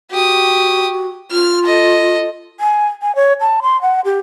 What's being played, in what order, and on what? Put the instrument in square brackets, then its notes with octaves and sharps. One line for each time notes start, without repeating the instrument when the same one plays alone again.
[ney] F#4 [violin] G4 D#6
[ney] F4 [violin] F6
[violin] A4 D#5
[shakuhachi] G#5
G#5
C#5
A5
C6
F#5
G4